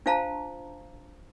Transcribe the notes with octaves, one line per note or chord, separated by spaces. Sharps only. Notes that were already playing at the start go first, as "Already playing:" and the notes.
D4 F4 C5 F5 A5 A#5